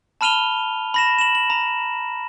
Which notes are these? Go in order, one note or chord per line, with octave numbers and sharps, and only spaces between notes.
A5 B5 F6 D#7 F7 G7
B5 A#6 E7
E7 F#7
F#7
A#5